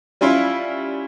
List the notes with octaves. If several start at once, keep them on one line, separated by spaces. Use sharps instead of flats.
G3 C#4 E4 F4